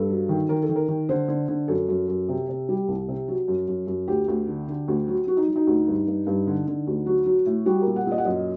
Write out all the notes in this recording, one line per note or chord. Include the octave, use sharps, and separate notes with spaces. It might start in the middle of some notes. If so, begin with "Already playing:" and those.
Already playing: G2 A4
F#3
D#3
D#3 A#4
A4
D#3
A#4
D#3
D3 C5
D3
D3
F#2 A4
F#2
F#2
C3
C3
G3
C2
C3
F#3
F#2
F#2
F#2
D2 G4
D2
D3
D3
D2
F#3
F#3 F#4
D#4
F#3
D#4
D2
G2
G2
G2
D3
D3
D2
F#3 F#4
F#3
A2
G3 F#4
A#4
A#2
F#5
A#2
D#5
F#5
F#2 D#5